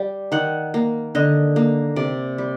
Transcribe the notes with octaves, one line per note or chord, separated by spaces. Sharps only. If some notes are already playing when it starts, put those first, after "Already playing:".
Already playing: G3
D#3 F#5
A#3
D3 D#5
A#3
C3 D5
G3